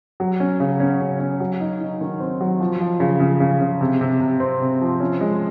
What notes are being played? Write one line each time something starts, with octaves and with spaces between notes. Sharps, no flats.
F#3
C#4
C#3
C#4
C#3
C#4
F#3
D#4
D#4
D#3
C4
F#3
F3
F3
C#3
C#3
C#3
C#3
C3
C3
C3
C4
C3
F3
C#4
G#3